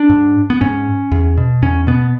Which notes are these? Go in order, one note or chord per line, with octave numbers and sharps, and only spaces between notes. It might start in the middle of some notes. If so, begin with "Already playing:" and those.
Already playing: D4
G#2
B3
G#2 C#4
E2
B2
E2 C#4
B2 B3